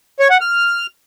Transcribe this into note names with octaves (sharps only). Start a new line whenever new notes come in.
C#5
F#5
F6